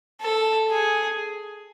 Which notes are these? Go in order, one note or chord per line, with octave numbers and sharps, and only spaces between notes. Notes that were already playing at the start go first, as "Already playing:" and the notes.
A4
G#4